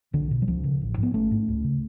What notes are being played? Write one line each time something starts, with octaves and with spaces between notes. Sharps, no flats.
B1 D3
B2
F#3
C#2 F3
C#3
A1
G#2
B3
G#1 A3 C#4
G#2
C#2
C#3